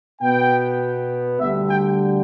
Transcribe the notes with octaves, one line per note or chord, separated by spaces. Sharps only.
B2 B3 G5
D2 D3 G3 E5
G5